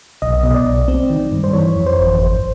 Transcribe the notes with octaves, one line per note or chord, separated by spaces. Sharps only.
B1 D#5
B2 D#5
D5
B1
C4
D#3
G2
C5
E3 C#5
F2
C5
G1
G#1 C5